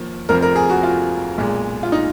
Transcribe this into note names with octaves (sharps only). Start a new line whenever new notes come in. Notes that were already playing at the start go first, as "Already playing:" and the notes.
Already playing: D#2 F3 A#3
F1 F2 F3 A#4
A#4
G#4
F#4
F4
B1 A#2 G#3
F4
D#4